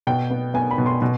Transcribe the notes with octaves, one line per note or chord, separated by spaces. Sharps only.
B2 G5
B3
B3 G#5
B5
B2
C6
B2